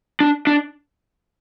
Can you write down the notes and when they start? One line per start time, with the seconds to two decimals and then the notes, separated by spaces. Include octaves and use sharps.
0.20 D4
0.47 D4